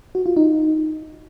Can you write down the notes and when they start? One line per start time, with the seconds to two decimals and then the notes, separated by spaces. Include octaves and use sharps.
0.15 F#4
0.26 F4
0.37 D#4